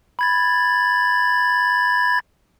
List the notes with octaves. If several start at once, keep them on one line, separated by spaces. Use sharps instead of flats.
B5 G#6 A6